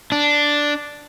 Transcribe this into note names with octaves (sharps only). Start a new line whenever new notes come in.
D4